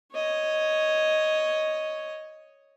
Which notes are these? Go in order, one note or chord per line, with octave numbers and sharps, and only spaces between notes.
C#5 D#5